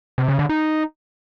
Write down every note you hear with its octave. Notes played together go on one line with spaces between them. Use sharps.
C3
C#3
D3
D#4